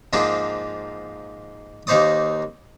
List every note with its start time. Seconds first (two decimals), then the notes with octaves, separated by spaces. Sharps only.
0.13 G#2 F3 A#3 D4 F4 G#4
1.87 D#2 A#3 D#4 C5 D5 D#6